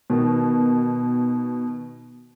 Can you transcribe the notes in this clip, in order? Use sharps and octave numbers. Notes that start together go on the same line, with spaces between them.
B2 D#3